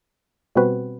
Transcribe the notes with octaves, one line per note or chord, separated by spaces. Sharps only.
B2 G3 C4 F#4 B4